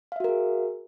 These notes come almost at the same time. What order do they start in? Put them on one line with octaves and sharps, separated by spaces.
F5 E5 F#4 A#4 G#4